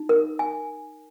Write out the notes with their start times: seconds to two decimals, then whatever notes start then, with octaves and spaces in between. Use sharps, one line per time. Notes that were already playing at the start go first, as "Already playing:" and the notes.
Already playing: D#4
0.09 A#4
0.39 G#5